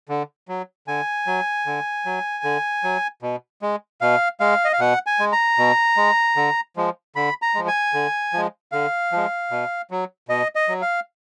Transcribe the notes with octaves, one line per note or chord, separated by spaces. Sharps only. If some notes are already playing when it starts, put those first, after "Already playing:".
D3
F#3
D3 G#5
F#3
D3
F#3
D3
F#3
B2
G#3
B2 F5
G#3 F5
D#5
F5
B2 F#5
G#5
G#3
A#5
B2
G#3
D3
F3 G#3
D3 B5
A#5
F3 G#3
G#5
D3
F3 G#3
D3 F5
F3 G#3
B2
F#3
B2 D#5
D#5
F#3
F5